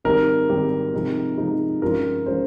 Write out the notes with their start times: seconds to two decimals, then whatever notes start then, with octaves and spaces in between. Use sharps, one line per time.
0.04 G#1 G#2 G3 C4 G4 A#4
0.49 G#1 G#2 G3 C4 G4
0.94 C3 F3 G#3 D#4
1.37 C3 F3 G#3 D#4
1.82 G2 F3 G#3 C#4 F4 A#4
2.26 F3 G#3 C#4 F4 C5